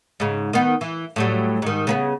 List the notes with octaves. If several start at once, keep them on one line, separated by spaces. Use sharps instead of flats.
G#2 C#3
D#3 B3
E3
A2 F#3 G3
G#2 D#3
C#3 A#3 B3